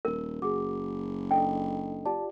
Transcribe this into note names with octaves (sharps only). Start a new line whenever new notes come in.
D#1 A#4
F#1 F#4 G#4 D6
D4 A4 D#5 G5
F4 G4 D5 A5